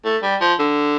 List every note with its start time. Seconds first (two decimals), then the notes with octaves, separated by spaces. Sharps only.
0.05 A3
0.23 G3
0.41 F3
0.59 D3